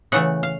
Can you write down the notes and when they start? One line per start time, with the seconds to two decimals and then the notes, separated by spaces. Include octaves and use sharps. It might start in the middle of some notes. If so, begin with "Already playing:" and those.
0.12 C#3 E3 A3 F#5
0.43 F5